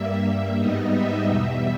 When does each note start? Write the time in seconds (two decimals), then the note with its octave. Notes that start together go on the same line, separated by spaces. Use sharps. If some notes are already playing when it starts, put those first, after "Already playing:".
Already playing: G2 G3 A#3 E5
0.25 E5
0.58 G#2 G3 B3 D#4 D#5
0.93 E5
1.26 E2 B2 G3 E5